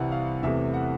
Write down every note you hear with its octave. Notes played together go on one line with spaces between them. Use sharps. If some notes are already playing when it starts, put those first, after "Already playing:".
Already playing: C2 C3 E3 G3 F#5
F5
E2 C3 E3 A3 E5
F#5